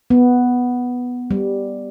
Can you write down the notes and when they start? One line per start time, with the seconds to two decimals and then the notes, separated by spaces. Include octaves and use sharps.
0.10 B3
1.31 G3